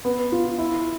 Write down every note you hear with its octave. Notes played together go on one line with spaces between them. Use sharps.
B3
F4
E4